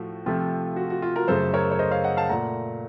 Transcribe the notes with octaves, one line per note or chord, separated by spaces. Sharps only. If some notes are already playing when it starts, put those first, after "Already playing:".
Already playing: A2 F3 A3 F#4
C3 F3 A3 F4
F#4
F#4
F4
F#4 A#4
F#2 C#3 A3 A4 C5
A#4 C#5
C#5
C5 D#5
C#5 F5
D#5 F#5
F5 A5
A#2 A3 F#5 A#5